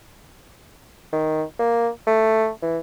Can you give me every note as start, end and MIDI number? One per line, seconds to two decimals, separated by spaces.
1.13 1.43 51
1.59 1.89 58
2.07 2.50 57
2.62 2.78 52